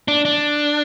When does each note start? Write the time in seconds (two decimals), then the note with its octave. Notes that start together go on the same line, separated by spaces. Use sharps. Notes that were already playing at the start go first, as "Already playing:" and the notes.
0.08 D4
0.25 D4